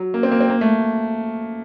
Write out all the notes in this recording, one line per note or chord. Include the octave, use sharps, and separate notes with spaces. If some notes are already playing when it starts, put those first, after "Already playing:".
Already playing: F#3
A#3
C4
A#3
C4
A#3
A3